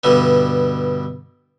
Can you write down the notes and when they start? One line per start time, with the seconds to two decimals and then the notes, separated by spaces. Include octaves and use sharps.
0.04 G2 B2 D3